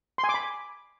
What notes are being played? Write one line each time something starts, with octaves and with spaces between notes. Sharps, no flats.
C6
G#5
D6
B5